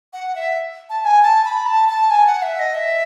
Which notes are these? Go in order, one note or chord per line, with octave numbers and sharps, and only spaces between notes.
F#5
E5
A5
A5
G#5
A5
B5
A5
A5
G#5
F#5
E5
D#5
E5